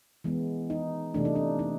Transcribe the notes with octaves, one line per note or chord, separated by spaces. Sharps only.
E3 G#3 B3
D#4
C3 E3 A3 D4
D#4
D4
D#4